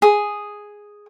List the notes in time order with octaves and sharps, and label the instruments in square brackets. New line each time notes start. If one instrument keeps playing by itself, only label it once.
[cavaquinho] G#4